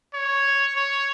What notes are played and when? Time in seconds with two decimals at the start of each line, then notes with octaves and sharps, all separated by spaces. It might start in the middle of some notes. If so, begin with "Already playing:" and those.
0.14 C#5
0.76 C#5